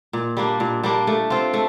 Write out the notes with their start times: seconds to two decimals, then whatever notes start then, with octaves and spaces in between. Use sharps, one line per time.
0.13 A#2
0.37 G3 A#3 D4
0.60 A#2
0.83 G3 A#3 D4
1.07 A3
1.30 C4 F4
1.54 A3